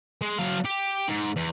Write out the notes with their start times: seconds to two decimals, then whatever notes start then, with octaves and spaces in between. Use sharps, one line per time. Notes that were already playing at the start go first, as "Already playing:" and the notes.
0.21 G#3
0.38 F#3 F5
0.65 G4
1.08 G#2
1.36 E2